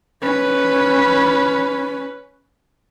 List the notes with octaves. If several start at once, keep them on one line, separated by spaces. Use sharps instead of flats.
C#4 B4